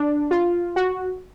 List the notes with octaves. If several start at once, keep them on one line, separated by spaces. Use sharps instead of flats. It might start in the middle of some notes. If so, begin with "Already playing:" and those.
Already playing: D4
F4
F#4